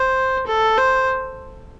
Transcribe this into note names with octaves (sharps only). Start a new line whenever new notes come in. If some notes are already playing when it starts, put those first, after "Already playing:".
Already playing: C5
A4
C5